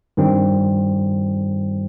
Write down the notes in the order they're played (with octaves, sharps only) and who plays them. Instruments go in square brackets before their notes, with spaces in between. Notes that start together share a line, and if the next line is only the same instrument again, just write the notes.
[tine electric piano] G2 D#3 G3 C4